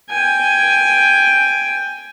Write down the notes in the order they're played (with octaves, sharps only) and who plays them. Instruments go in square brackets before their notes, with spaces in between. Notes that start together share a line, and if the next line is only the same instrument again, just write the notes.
[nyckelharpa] G5 G#5